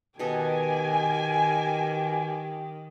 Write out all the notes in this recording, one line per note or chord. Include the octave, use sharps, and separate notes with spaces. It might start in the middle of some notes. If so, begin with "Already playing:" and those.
B2 D#3 G4 A4 D#5 G#5